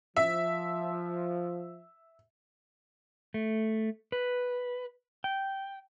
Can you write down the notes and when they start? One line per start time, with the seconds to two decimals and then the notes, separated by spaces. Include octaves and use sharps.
0.17 F3 E5
3.34 A3
4.12 B4
5.24 G5